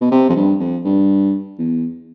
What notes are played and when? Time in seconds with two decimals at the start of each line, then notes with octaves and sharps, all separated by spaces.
0.01 B2
0.11 C3
0.29 F2
0.36 G2
0.60 F2
0.85 G2
1.59 E2